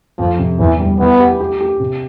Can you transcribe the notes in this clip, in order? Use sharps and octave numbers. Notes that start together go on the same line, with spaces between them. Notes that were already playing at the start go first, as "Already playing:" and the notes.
F2 F3
C3
E2 E3
G3
E3 B3
G4
G4
G4
C3